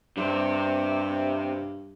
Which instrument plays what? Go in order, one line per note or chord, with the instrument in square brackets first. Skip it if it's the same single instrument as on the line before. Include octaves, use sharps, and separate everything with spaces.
[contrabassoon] G2 [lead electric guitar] C3 C5